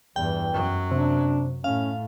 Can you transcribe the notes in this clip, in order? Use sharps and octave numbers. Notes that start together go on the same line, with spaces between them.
E2 G2 E3 G5
F#2 F#3
C3 D4
A2 C#4 F5